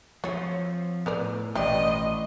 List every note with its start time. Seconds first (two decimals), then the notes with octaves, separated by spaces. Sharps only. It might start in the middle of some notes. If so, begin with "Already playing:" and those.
0.24 F3 C4 F#4 C#5
1.06 A2 B3 A#4 D5
1.55 A1 B2 G3 G4 D5 D#5